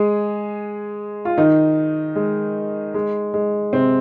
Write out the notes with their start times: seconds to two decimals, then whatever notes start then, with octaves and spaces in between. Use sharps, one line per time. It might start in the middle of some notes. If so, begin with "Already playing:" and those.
Already playing: G#3 G#4
1.25 F4
1.38 D#3 D#4
2.15 G#3
2.94 G#3
3.34 G#3
3.73 C3 C4